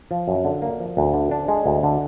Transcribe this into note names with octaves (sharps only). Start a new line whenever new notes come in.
F3
F#2
D3
A#3
F3
D2
D3
D4
G#3
D2
D3